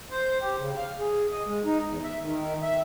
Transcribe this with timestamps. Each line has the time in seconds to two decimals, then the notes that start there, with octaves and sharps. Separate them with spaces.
0.11 C5
0.41 G4
0.57 C#3
0.77 F5
0.99 G#4
1.31 D#5
1.47 G#3
1.65 D#4
1.86 E2
2.04 E5
2.22 D#3
2.62 E5